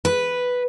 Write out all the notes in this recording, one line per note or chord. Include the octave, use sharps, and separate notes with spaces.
B4